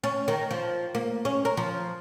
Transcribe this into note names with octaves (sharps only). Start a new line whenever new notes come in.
C#4
D#3
F3
A#3
C#4
A#4
F3